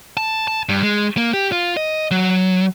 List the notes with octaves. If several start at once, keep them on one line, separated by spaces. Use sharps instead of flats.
A5
A5
G2
G#3
A#3
G4
F4
D#5
F#3